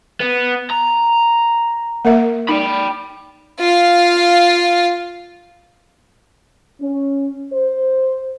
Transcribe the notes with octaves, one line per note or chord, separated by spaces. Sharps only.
B3
A#5
A#3 A#4 E5
D#4 G5 B5
F4 F5
C#4
C5